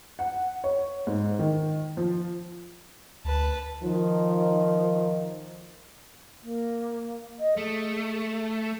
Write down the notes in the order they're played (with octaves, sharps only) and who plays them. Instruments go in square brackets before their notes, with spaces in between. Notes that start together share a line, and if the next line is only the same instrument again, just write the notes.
[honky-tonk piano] F#5
C#5
G#2
D#3
F3
[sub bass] D2 [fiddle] B4 A5
[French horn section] D#3 F3
[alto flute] A#3
D#5
[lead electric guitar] A3 [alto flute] G#4